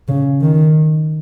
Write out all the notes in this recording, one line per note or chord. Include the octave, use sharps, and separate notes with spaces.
C#3
D#3